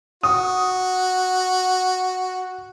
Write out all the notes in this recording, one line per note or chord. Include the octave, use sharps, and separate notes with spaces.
F#4 D#6